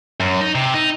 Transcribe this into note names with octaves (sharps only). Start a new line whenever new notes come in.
F#2
D#4
C3
D#4